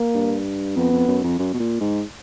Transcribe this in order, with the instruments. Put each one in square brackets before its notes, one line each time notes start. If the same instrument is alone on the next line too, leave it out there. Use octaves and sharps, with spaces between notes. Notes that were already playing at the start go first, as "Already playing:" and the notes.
Already playing: [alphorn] A#3
[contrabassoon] G2
[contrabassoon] F2 [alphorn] B3
[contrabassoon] F2
F#2
F2
F#2
B2
A#2
G#2